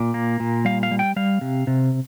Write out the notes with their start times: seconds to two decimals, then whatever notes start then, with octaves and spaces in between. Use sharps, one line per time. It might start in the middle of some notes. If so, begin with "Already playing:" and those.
Already playing: A#2 D5
0.14 A#3
0.40 A#2
0.65 G3 F5
0.83 F5
0.91 G3
0.99 G5
1.16 G3 F5
1.41 C3
1.67 C3